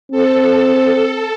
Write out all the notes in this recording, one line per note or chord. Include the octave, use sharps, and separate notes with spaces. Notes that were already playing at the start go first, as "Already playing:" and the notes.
C4 A4